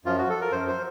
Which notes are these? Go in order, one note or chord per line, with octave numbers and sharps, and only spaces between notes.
F#2 F3 F4
F#4
A4
A#4
F#2 F3 C5
C5